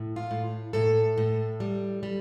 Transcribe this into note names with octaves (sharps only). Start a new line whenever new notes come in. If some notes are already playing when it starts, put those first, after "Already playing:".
Already playing: A2
F4
A2
A2 A4
A2
G3
G3